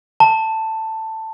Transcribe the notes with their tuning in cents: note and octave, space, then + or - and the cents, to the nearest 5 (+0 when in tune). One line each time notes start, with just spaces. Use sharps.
A5 +10